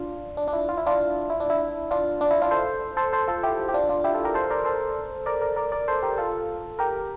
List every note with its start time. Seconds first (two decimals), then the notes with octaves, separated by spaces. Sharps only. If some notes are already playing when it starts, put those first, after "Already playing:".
Already playing: D4 F4
0.37 D4
0.48 D4
0.53 E4
0.69 F4
0.78 E4
0.86 D4 F4
1.30 E4
1.40 D4
1.50 E4
1.91 D4 F4
2.21 D4
2.31 E4
2.42 D4 F4
2.51 A4 C5
2.97 A4 C5
3.13 A4 C5
3.28 F4 A4
3.43 E4 G4
3.69 G4
3.74 D4 F4
3.89 D4 F4
4.04 E4 G4
4.14 F4 A4
4.24 G4 A#4
4.34 A4 C5
4.50 A#4 D5
4.65 A4 C5
5.26 A#4 D5
5.42 A#4 D5
5.56 A#4 D5
5.72 A#4 D5
5.88 A4 C5
6.03 G4 A#4
6.18 F4 A4
6.79 G4 A#4